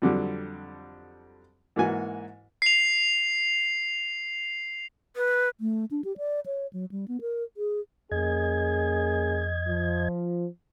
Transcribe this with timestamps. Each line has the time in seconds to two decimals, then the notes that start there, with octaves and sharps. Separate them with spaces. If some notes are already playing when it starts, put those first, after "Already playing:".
0.02 F2 D3 F#3 G3
1.76 G#2 E3 A#3 F#4 G#5
2.62 C7 F7
5.16 B4
5.61 A3
5.91 D4
6.04 G4
6.17 D5
6.46 C#5
6.73 F#3
6.92 G3
7.08 B3
7.21 A#4
7.57 G#4
8.12 F2 A#3 C#4 G#4 D#5 G#6
9.67 F3